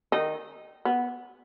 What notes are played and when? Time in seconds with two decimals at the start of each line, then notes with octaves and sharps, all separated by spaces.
0.12 D#3 D#4
0.85 B3